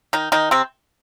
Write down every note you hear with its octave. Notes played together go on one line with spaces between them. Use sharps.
D#3 D#4
D#3 D#4
C3 C4